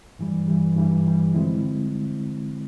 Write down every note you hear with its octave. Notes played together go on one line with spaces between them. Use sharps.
G2 E3 G3
G2 E3 G3
G2 E3 G3
G2 E3 G3
D3 F3 G#3 C4 E4